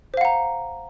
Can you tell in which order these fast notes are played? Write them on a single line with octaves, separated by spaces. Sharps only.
C5 F5 F#5 A#5